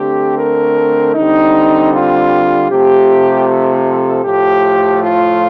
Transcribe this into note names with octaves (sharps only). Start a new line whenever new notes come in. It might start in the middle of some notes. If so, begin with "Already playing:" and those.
Already playing: D3 A3 C4 G4
A#4
D3 G3 C4 D#4
F4
C3 F3 A3 G4
A4
A2 F3 A3 G4
F4